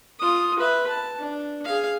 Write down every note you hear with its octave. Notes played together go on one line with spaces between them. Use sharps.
F4 D#6
B4 E5
A5
D4
G#4 F5